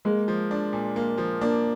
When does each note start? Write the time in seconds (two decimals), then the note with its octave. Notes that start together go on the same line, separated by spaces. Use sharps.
0.05 G#3 A#3
0.28 F3
0.51 D4
0.73 A#2
0.96 A#3
1.18 F3
1.41 A#3 D4